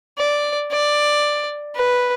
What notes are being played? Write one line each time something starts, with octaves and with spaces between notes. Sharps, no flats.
D5
D5
B4